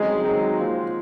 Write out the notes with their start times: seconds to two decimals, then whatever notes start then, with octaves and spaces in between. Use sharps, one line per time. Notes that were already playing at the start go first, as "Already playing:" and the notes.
Already playing: C#3 F#3 G#3 C4 D#4 G#4
0.25 D#3 F#3 C4 D#4
0.59 F3 A#3 F4 C5